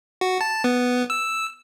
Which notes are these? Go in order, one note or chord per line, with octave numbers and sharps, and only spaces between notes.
F#4
A5
B3
E6